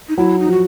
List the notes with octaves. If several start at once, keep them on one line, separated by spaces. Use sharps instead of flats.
D#4
F#3 E4
D#4
F3
F#4